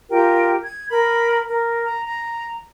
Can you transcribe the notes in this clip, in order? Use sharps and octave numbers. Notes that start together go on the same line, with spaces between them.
F4 G4 A#4 G5
G#6
A#4 B5
A#4
A#5
A#5